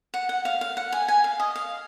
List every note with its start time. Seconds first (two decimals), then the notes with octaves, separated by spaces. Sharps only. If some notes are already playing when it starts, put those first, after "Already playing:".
0.14 F#5
0.29 F#5
0.45 F5
0.61 F5
0.77 F#5
0.92 G#5
1.08 G#5
1.24 F5
1.40 D#5
1.56 F5